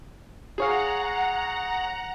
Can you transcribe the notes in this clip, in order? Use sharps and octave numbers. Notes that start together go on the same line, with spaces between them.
G#4 C#5 F5 F#5 A#5